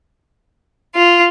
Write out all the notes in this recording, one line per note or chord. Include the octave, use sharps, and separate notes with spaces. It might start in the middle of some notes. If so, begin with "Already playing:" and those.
F4